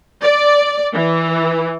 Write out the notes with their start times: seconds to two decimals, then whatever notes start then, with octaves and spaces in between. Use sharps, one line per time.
0.23 D5
0.94 E3